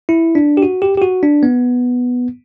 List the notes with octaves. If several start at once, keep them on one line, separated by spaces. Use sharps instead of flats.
E4
D4
G4
F#4
G4
G4
F#4
D4
B3